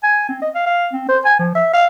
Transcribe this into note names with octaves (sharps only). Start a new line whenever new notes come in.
G#5
C4
D#5
F5
F5
C4
C5
G#5
F3
E5
F5